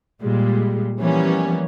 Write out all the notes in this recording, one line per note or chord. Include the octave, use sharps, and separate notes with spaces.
A#2 G3 G#3
E3 F3 G3 A#3 B3 C#4